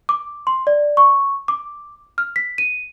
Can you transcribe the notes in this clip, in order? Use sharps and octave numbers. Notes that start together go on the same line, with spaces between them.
D6
C6
D5
C#6
D6
F6
B6
D#7